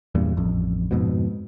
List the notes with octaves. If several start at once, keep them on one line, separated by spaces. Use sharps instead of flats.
E2 G2 A#2
A1 F2
F2 G#2 B2